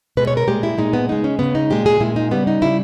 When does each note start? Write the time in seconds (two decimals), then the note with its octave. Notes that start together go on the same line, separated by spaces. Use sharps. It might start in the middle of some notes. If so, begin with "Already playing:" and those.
0.17 B2 G#3 B4
0.27 C#5
0.37 A#4
0.47 A#2 G#3 G4
0.63 E4
0.78 A#2 G#3 D#4
0.93 B3
1.09 C#3 G#3 D#4
1.24 C#4
1.39 C#3 G#3 B3
1.55 D#4
1.70 A#2 G#3 G4
1.86 G#4
2.00 A#2 G#3 E4
2.16 D#4
2.31 C#3 G3 B3
2.47 D#4
2.61 C#3 G3 E4